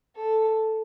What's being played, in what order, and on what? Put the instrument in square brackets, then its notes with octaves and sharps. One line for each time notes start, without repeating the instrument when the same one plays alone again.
[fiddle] A4